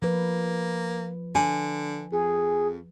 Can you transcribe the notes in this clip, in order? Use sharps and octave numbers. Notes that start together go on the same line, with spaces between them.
F3 A#3 B4
D3 G#5
F2 G#4